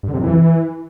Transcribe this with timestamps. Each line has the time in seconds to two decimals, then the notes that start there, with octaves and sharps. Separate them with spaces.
0.03 G2
0.08 D3
0.13 C3
0.19 F2
0.24 E3